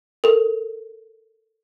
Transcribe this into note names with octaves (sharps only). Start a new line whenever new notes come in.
A4 A#4